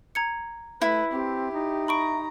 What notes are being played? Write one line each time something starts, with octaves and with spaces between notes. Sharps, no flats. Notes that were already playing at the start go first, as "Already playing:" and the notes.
A#5 G#6 C#7
A3 E4 B4
C4 G4
D#4
A#5 B5 C#6 D7